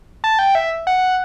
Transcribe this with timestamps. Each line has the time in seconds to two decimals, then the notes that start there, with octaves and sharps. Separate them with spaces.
0.24 A5
0.39 G5
0.55 E5
0.87 F#5